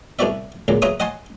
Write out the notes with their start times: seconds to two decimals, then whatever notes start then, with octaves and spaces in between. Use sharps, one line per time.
0.19 C2 B3 E4 F#4 D5 E5
0.68 C#2 A#2 D3 F#3
0.82 C#3 F#3 F4 B4 E5 D#6
1.00 D#5 F#5 G#5 A5 C6